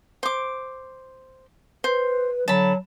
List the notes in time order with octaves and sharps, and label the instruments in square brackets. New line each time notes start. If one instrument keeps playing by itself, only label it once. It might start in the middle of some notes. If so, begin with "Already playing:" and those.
[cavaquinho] C5 D6
[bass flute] B4 [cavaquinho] C5
[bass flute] D3 [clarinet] F#3 [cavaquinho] A5 B5